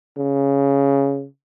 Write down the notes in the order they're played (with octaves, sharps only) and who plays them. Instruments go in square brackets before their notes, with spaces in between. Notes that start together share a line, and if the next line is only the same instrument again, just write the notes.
[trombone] C#3